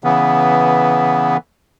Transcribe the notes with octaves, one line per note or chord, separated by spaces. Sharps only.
C#3 E3 B3